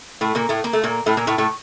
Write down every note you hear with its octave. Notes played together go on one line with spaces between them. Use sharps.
A2 A3
A#2 A#3
A2 A3
A#3
A3
A#2 A#3
A2 A3
A#2 A#3
A2 A3
A2 A3